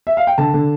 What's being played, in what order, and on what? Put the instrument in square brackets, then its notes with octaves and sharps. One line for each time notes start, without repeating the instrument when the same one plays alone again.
[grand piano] E5
F5
G5
D3 A5
D3